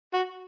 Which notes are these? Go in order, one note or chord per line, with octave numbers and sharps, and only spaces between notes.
F#4